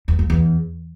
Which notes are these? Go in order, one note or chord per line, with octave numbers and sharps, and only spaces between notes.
E2
F2
E2